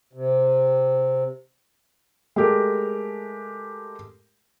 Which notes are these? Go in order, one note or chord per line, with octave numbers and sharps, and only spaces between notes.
C3
G#3 A3 G4 A#4